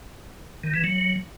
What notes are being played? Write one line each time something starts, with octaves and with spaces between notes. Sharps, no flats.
D#3
E3
F#3